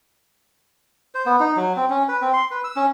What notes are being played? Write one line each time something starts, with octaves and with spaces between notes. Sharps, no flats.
C5
B3
D#4
F#3
C4
C#4
B4
C4
C6
B4
E6
C#4